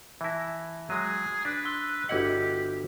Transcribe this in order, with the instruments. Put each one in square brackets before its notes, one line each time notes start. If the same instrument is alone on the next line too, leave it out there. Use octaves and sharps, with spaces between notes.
[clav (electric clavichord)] E3 E4 [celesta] E5 A5 A#6
[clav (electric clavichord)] F#3 G#3 [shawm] G#4 [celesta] D#7
[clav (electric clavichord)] D4 [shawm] B4
[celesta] C6 E6 G7
[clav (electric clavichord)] G1 E4 F#5 [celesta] F#4 D#5 [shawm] G4